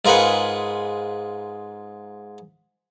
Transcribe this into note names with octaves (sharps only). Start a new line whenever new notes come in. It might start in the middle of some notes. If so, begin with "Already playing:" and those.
G#2 F4 G#4 A#4 B4 F#5